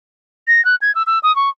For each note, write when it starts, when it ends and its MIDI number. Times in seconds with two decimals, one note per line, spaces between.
0.48 0.64 94
0.65 0.75 90
0.82 0.94 92
0.95 1.03 88
1.07 1.19 88
1.23 1.34 87
1.36 1.49 85